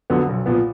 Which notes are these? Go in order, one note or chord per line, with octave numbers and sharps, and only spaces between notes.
F2 D3 F#3 B3
B1
A#2 F3 B3